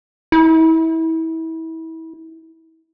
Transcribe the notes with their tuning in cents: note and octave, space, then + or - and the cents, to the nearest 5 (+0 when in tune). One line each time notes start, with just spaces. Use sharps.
E4 -30